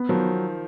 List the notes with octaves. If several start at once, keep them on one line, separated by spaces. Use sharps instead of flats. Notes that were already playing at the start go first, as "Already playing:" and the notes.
Already playing: B3
D#3 F3 F#3